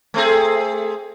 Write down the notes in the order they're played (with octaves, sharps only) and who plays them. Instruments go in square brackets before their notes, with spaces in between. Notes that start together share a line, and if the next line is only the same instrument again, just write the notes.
[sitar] A3 C4 G#4